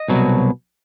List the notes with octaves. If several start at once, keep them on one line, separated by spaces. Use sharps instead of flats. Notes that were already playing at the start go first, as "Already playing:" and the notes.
Already playing: D#5
C2 B2 F#3